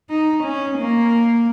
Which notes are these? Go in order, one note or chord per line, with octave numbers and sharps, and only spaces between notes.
D#4
C#4
A#3